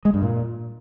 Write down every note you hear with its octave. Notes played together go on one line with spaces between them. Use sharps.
G#3
G2
A#2